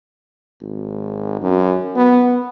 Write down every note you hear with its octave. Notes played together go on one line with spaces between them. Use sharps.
G#1
F#2
B3